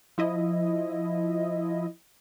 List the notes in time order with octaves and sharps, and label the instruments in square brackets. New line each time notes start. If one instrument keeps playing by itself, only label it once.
[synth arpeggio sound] F3 E4 D#5